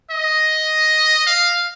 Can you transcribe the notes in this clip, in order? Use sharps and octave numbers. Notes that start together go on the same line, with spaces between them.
D#5
F5